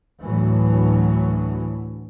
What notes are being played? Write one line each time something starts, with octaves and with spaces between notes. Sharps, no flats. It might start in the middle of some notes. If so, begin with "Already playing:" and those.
D2 A2 E3 F#3